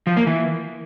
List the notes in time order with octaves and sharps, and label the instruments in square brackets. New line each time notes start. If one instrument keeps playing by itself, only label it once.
[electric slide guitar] F3
A#3
E3